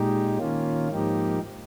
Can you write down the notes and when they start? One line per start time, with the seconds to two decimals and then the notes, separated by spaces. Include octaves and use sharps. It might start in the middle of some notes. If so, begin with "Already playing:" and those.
Already playing: A#2 G#3 D#4 G4
0.39 D#3 A#3 C#4 F4
0.89 G#2 F3 A#3 D#4 G4